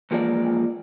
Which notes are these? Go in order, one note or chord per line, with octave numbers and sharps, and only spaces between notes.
E3 F3 G#3 A#3 D5